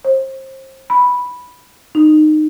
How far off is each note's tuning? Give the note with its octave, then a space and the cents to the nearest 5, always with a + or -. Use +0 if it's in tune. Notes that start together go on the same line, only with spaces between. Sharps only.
C5 +30
B5 -5
D#4 -20